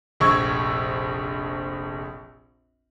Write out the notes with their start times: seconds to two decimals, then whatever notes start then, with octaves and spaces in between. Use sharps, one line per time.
0.20 F1 A#1 C#6 E6 G#6